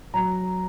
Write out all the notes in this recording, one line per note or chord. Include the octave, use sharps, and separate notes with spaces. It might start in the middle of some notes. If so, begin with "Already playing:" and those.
F#3 A#5